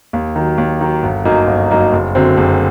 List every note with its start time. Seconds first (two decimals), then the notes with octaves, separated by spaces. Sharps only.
0.13 D#2
0.36 D#3 F#3
0.58 D#2
0.81 D#3 F#3
1.03 G1
1.25 F#2 F#3 A#3 D#4
1.47 G1
1.70 F#2 F#3 A#3 D#4
1.93 F#1
2.15 F#2 D3 F#3 C4
2.37 F#1